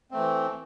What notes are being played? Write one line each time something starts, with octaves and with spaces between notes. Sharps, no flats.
E3 A3 C4